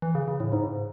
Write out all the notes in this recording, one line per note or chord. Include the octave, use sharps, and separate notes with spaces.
E3
C#3
C#3
A2
G#2